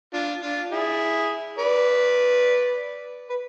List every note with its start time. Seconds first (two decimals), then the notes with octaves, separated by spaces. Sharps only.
0.13 D4 F4
0.42 D4 F4
0.71 E4 G#4
1.58 B4 D5
3.30 B4